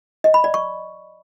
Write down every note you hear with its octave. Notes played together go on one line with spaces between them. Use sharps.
D#5
B5
D5
C#6